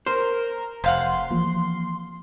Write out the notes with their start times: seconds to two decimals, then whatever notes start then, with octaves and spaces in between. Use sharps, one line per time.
0.06 A#4 C5
0.84 F1 C3 F5 F#5 C6
1.30 E3 F3 A#3